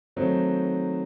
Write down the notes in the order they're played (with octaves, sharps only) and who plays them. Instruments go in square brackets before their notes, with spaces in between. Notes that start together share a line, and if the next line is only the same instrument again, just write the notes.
[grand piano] D#3 F#3 A3 C4 D#4